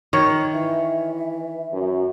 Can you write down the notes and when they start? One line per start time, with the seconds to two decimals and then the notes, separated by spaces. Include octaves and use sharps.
0.13 D#3 C#5
0.53 E3 E5
1.73 F#2